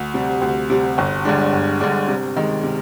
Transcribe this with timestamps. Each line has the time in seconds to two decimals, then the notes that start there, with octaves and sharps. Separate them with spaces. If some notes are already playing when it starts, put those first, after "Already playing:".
Already playing: D2
0.14 C3 G3
0.42 D2
0.70 C3 G3
0.98 G1
1.25 G2 D3 G#3 D4
1.53 G1
1.80 G2 D3 G#3 D4
2.08 C3
2.37 D#3 G#3
2.63 C3